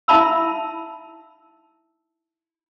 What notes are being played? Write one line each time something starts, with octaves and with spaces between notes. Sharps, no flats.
D#4 E4 E5 A5 B5 E6